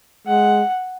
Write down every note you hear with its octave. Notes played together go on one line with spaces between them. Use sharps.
G#3 F#5